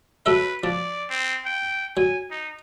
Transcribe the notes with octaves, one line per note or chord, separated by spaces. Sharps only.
F#3 A4 B4 E5
F3 D5
C4
G5
F#3 G#5
D#4